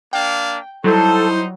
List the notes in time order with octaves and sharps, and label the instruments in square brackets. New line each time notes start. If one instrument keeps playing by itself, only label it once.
[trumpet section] A#3 D4 F5 [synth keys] G5
[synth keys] F#3 G3 [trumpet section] D#4 C5 [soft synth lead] E4 [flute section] A4